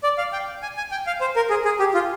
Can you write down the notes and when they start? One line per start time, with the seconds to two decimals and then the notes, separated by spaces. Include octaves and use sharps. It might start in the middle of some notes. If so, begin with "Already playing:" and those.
0.03 D5
0.18 F5
0.32 G5
0.62 G#5
0.77 G#5
0.91 G5
1.07 F5
1.21 C5
1.36 A#4
1.50 G#4
1.65 G#4
1.79 G4
1.94 F4